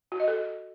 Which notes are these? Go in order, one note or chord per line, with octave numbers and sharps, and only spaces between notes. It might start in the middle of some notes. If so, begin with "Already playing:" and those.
F#4
D#5
A4